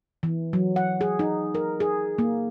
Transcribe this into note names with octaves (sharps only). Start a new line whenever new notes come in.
E3
F#3
F#5
G#4
D#4
A#4
G#4
A#3